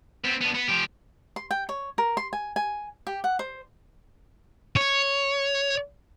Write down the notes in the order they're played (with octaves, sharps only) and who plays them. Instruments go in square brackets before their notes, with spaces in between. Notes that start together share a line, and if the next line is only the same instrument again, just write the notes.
[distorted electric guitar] B3 C4
B3 D4
B3
F3 G4
[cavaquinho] C6
G5
C#5
A#4
C6
G#5
G#5
G4
F#5
C5
[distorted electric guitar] C#5